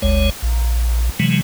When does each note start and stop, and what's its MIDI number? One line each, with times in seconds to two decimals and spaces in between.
0.02 0.30 31
0.02 0.30 38
0.02 0.30 56
0.02 0.30 73
0.42 1.09 34
1.20 1.41 48
1.20 1.41 52
1.20 1.41 54
1.20 1.41 56